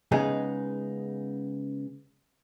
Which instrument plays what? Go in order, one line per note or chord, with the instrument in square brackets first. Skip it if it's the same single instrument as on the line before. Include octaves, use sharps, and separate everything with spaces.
[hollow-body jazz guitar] C#3 G#3 B3 D#4 G#4